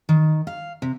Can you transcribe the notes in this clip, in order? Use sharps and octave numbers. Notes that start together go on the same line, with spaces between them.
D#3
F5
C3